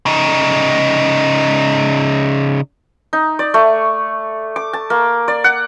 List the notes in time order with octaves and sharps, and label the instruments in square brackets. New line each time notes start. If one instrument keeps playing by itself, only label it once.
[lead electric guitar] C#3 D#4
[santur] D#4
D5
A3
D6
A5
A#3
D5
F#5